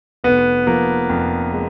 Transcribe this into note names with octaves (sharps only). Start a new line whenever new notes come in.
F1 B3
F3 A#3
F2
G#3